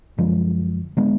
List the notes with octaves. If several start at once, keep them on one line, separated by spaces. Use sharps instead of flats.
F#2 D3 F3 G#3
D3 G#3 B3